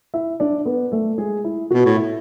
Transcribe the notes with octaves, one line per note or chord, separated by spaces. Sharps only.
E4 E5
D4 D5
B3 B4
A3 A4
G#3 G#4
E4
B2 F#4
A2
E4